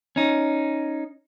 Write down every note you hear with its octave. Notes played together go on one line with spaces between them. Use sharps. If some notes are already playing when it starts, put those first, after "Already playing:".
C#4 D#4